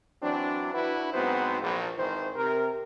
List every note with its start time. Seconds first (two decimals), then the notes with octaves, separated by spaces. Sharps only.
0.22 E3 F#3 C4 D4
0.74 D4 E4 F#4 B4
1.14 G#2 F#3 B3 C4 C5
1.61 A#1
1.97 G#1 D#3 E3 C5
2.35 C3 A#4